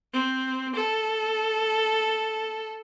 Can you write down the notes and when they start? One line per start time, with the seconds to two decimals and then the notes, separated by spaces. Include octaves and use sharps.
0.13 C4
0.75 A4